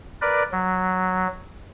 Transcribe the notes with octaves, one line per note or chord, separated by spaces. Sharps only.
A#4 B4 D5
F#3